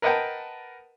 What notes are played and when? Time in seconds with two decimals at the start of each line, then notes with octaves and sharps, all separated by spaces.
0.02 A#4 B4 D#5 F#5 G5 A5